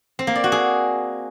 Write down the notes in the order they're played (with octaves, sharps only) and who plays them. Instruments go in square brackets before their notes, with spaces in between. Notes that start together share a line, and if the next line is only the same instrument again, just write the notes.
[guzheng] C4
A#3
D5
F#4
G#4